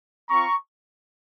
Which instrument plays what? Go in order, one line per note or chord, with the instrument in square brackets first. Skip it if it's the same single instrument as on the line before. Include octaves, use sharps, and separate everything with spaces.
[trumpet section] C4 F4 A#5 C#6